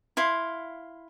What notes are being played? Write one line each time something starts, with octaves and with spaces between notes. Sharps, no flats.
E4 F5 C6